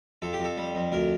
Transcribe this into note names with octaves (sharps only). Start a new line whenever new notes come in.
F2 A4
G4
F2 A4
G3
F2
D2 A#4